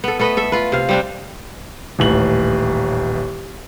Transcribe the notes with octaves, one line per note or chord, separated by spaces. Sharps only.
B3 A4
A3 A4 B4 D#5
A4 E5
F4 B4
C3 F5
G3 C4 D4
D#1 A1 F#7